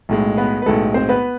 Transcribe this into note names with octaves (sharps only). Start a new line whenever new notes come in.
B1 A2 G#3
B3 B4
B4
B1 A2 G#3 A4
C4 C5
B3 B4